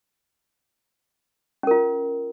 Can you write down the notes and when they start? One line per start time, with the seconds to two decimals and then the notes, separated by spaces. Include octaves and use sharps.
1.63 C#4
1.67 A#4
1.71 F4